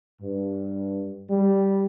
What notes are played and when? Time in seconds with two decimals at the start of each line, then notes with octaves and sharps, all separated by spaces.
0.21 G2
1.30 G3